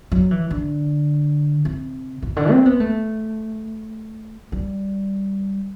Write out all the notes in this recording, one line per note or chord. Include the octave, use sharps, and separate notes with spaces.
F#3
E3
D3
C3
B2
D3
C4
B3
A3
G3